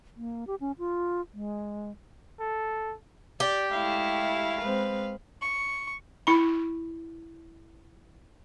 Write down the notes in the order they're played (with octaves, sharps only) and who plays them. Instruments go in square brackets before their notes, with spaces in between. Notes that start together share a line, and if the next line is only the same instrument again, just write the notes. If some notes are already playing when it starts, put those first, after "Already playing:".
[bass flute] A#3
G4
C#4
F4
G#3
[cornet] A4
[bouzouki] G4 [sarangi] D5
[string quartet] G#3 A3 E4 [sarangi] F5
[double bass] G#3 C4 [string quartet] B4
[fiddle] C#6
[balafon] E4 B5